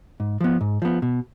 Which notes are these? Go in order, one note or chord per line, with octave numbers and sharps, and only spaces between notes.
G#2
F3 B3
G#2
F3 B3
B2